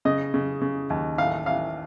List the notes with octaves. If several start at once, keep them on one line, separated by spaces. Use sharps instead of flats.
C#3 D#5
C#3
C#3
D#2
A1 F5
A1 F5